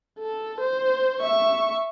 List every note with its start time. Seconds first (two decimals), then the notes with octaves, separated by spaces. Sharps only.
0.19 A4
0.60 C5
1.20 E5 C#6